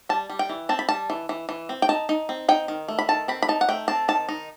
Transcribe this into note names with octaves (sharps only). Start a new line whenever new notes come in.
G3 A5
G3
G5
E3
C4 A5
B5
G3 A5
E3
E3
E3
C4
G5
D#4 A5
D#4
C4
D#4 G5
D#3
A3
B5
D#3 A5
C4 B5
B5
D#4 A5
F#5
A3 G5
C4 A5
D#3 A5
D#4